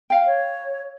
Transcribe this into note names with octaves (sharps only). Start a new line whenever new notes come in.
F5 G5
C#5